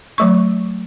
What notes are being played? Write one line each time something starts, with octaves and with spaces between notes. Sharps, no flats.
F#3 A3 C#6